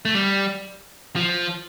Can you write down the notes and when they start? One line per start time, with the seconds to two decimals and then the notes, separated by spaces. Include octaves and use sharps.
0.05 A3
0.14 G3
1.16 F3